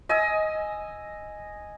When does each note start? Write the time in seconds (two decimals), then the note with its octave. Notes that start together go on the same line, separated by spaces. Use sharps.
0.09 D#5 G#5 E6